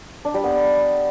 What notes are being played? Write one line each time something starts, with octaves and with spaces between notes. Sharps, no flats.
D4
G3
B3